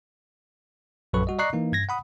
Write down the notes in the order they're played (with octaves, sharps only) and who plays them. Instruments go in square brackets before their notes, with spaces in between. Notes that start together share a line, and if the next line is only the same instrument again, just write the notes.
[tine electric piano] A#1 F#2 F#3 A4 B4 C#6
G3 F#4 D#5
D5 D#5 A#5 C#6 F#6 C7
E3 A#3 D#4
G2 G#6 A#6
F#5 B5 D#6